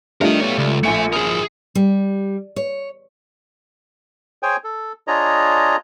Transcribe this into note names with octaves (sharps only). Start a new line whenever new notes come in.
G3 A3 D4 F4 A#4 D#5
B3 A4 C#5
C#2
A#1 A3 E5 G#5 C#7
G#4 A#4 D#6
G3
C#5
G#4 C5 C#5 G5 G#5
A4
D4 F4 G#4 C#5 D#5 A#5